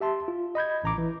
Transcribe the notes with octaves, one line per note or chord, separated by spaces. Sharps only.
G4 E5 A5 C6
F4
D#5 B5 G6 G#6
A1 A#5 D6
E3